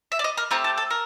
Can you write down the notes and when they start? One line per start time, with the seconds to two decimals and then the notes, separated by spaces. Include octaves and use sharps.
0.12 E5
0.19 D5
0.24 D#5
0.38 A#4
0.51 A3 C4 G4 A#4
0.64 A4
0.78 A4
0.90 A#4